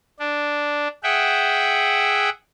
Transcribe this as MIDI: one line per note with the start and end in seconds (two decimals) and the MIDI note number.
0.19 0.88 62
1.03 2.30 68
1.03 2.30 76
1.03 2.30 78
1.03 2.30 79